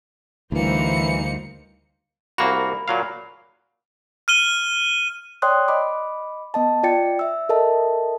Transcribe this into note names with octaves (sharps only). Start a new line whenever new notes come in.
D2 E3 G3 A#3 D#4 C5 C#7
C2 A#3 F#4 B5
A#2 F#3 F5
F6 D#7 G7
C#5 D5 G5 C6 D#6 F#6
D#5 B5 D6
B3 D#5 A5
F4 D5 G5 A6 C#7
E5 E6
A4 A#4 D#5 E5 A5